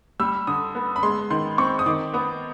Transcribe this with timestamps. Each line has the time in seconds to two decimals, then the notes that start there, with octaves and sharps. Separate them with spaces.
0.20 G3 E6
0.47 D3 D#6
0.75 B3
0.96 B5
1.03 G#3 C6
1.30 D#3 C6
1.58 C4 C#6
1.79 D#6
1.86 D#3 D6
2.14 B3 D#6